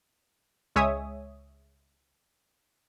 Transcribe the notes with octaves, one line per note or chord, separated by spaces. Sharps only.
C#2 G#3 C#5 E5 G#5 D#6